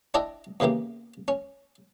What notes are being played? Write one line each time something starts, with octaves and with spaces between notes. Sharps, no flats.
D4 E4 D5 D#5 G5 A5
E2 C#3 E3 A#3 G4
C#4